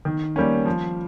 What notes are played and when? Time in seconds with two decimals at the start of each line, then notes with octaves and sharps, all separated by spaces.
0.05 D#3
0.36 G3 A#3 C#4
0.65 F3